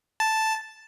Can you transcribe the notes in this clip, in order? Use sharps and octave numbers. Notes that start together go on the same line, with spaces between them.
A5